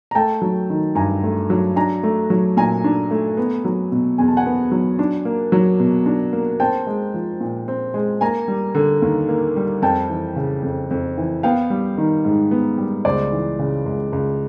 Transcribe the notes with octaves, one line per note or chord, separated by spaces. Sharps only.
A#5
A3 G5 A5
F#3
D#3
G2 G#5 A#5
A3
F#3
D4 G#5 A#5
A3
F#3
A#2 G#5 A#5
D4
A3
B3
F#3
B2
E2 G#5
A5
F#5 G#5
B3
F#3
D4
A#3
F#3
B2
D4
A#3
C4 G5 A5
G#3
F3
A#2
C4
G#3
A#3 G#5 A#5
G3
D3
D#2
A#3
G3
F2 G5 A5
E3
C#3
F2
F2
E3
B3 F5 G5
G3
D#3
G#2
B3
G3
C#2 C5 D5
E3
C#3
C#2
C#2